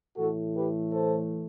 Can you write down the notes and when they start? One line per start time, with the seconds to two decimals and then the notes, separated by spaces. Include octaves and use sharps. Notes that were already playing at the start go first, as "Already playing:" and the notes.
0.17 A2 E3 A3 F#4 A4
0.55 G4 B4
0.93 A4 C5